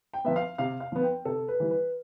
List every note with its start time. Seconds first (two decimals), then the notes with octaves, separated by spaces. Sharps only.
0.14 G5
0.24 F3 B3 E5
0.36 F5
0.58 C3 F5
0.80 F5
0.92 F3 B3
1.03 G5
1.25 C3 A4
1.48 B4
1.60 E3 G3
1.71 B4